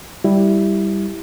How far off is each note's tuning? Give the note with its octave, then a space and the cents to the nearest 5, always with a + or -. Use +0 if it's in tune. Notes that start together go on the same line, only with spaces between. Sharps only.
G3 +0 E4 +0